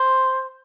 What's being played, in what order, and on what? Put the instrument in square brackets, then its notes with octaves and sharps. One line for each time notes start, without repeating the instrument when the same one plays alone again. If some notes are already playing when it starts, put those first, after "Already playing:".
Already playing: [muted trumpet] C5